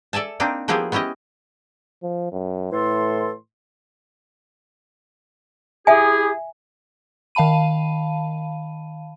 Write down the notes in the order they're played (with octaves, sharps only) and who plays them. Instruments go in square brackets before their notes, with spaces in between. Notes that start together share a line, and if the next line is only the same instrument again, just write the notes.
[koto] A4 D5 E5 G#5 A5
A#3 C4 D4 D#4
F3 A#3 B3 E4 G4 G#4
B3 C#4 E4 G4 D#5
[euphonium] F3
F#2
[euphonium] A2 [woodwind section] E3 A4 C6
[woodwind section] E4 G4 G#4 [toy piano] E5 G#5
[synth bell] D#3 F5 A5 B5 D#7